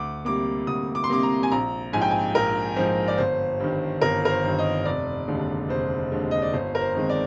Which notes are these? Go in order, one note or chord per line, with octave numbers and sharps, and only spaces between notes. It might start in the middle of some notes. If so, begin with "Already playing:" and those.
Already playing: D2 D6
C3 G3 A#3 D6
D2 D#6
D6
C6
C3 G3 A#3 D6
A#5
G#5
A#1 A#5
G#2 F3 G#5
G5
G#5
A#1 A#4
G#2 F3 C5
D5
G1 C5
G2 D#3
G1 A#4
A#4
C5
G2 D#3
D#5
F1 D5
D#2 D3 G#3
F1 C5
D#2 D3 G#3
D#5
D5
G1 C5
A#4
C5
F2 D#3 G#3
D5